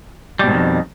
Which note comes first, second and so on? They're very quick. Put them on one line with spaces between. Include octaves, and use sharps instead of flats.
G3 B2 G#2 D#3 F2